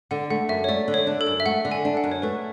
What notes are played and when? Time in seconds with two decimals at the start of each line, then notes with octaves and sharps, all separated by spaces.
0.11 D3 F#5
0.30 A3 F#5
0.49 F#2 E5
0.64 C#5
0.69 A3 D5
0.88 D3
0.94 C#5
1.07 D4
1.21 A4
1.26 F#2
1.40 E5
1.46 A3 F#5
1.65 D3
1.72 G#5
1.85 D4
1.97 F#5
2.04 F#2
2.12 C#5
2.22 A3 B4